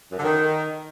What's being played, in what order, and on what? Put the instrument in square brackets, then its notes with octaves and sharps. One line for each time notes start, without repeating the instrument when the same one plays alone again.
[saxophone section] F#2
D3
D#3